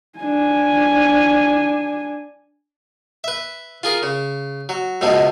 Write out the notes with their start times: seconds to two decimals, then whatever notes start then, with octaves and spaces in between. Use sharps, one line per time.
0.19 D4 G#5
3.24 B4 E5
3.83 F4 G#4 A#4
4.03 C#3
4.69 F#3
5.01 C#2 F#2 B2 F3 G#3